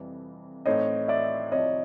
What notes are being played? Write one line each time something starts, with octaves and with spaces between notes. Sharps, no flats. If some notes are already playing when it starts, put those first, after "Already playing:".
Already playing: F2 C3 E3 G3
A2 E3 A3 C4 D#4 C#5 D#5
D5 E5
C2 C3 F3 C#5 D#5